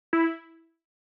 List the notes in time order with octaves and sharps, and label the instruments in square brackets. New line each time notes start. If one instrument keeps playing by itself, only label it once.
[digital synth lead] E4